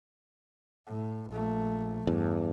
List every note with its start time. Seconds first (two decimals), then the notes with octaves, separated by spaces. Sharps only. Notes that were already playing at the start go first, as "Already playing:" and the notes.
0.87 A2
1.31 A#1 A3
2.07 E2 G2